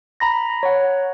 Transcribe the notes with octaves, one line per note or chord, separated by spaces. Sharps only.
A#5 B5 A#6
C#5 F#5